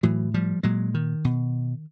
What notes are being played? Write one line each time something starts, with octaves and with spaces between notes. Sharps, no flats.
A2 E3 F#3
F3 G3
A#2 F#3 G#3
D#3
B2